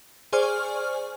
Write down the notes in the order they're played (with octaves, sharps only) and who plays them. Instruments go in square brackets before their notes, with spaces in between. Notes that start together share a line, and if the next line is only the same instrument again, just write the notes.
[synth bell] G#4 C5 D5 G#5 C#6 F6